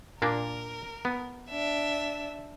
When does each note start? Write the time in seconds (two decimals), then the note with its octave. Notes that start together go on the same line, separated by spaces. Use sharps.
0.22 A#2 A#3 D4 A#4
1.05 B3
1.50 D4 E5